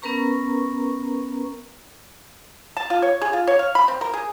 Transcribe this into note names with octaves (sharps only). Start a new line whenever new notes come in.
B3 C#4 A#4 B4 A#5 C#6
A5
F4
C#5
G#4
F4
C#5
F5
B5
C4
A#4
G#4